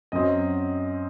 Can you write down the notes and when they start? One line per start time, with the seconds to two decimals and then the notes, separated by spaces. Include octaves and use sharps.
0.12 F#2 F#3 C4 D#5